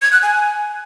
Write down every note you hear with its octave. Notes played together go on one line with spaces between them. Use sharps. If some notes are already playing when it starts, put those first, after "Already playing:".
G#6
F#6
G#5